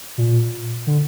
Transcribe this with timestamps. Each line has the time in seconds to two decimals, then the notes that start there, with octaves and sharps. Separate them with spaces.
0.18 A#2
0.87 D3